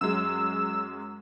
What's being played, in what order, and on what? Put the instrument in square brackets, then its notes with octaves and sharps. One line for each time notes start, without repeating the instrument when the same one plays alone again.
[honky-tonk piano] F#2 F#3 G#3 [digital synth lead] E6